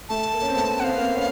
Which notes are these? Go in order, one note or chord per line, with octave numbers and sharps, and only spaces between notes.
A3 A5
A#3
C#4
C4
A3 B3
C4 F#5
B3 F5
A#3 C4
B3 C#4